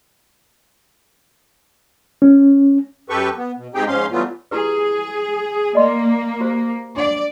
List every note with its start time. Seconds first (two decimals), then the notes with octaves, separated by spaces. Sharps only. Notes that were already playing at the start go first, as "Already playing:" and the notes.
2.22 C#4
3.09 F#2 G4 A4 B4 C#6
3.37 B3
3.57 B2
3.74 G#2 C4 D#4 G4 G#4 G5
3.88 G#2 F3 C#4 F5 C6
4.12 E3 F#3 G3 A3 B3 F4
4.51 E4 G4 G#4 B4
5.75 A#3 D5 D#5 C6
6.40 F#4 G4 C5
6.96 D4 D5 F#5